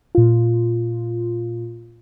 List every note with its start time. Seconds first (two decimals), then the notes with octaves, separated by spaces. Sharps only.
0.15 A#2 F4